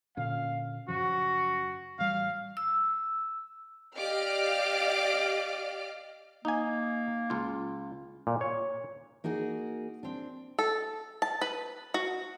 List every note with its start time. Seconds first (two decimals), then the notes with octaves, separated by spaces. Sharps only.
0.17 A#2 D3 C#4 F5
0.88 F#2 C#3 F3 F#4
1.99 A1 G3 F5
2.57 E6
3.98 G4 D5 D#5 F5 D6 F6
6.45 A#3 D#4 G#5
7.30 C#2 F4
8.27 A#2
8.41 C#5
9.24 A#3 D#4 F#4 G#4
10.03 C4 D4
10.59 A4
11.22 A5
11.41 B4
11.94 F#4